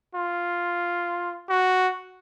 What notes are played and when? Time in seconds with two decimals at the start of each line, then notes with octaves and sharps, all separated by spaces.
0.15 F4
1.50 F#4